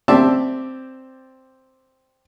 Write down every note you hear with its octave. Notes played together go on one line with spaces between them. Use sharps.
C4 G4 D5 E5 A5